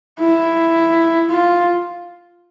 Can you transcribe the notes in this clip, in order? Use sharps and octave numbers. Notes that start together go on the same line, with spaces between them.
E4
F4